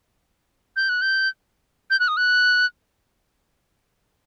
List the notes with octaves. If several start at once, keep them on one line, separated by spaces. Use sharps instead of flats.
G6
F#6
G6
G6
F#6
D#6
F#6